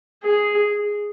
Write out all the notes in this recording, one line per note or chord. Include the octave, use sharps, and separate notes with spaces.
G#4